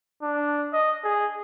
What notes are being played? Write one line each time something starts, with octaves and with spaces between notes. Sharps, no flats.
D4
D#5
G#4